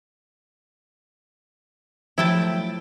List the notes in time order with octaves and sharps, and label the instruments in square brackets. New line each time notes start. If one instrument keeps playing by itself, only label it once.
[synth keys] F3 F#3 A3 [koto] E4 G5 A5